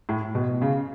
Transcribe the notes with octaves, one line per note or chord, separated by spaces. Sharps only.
A2
B2
C#3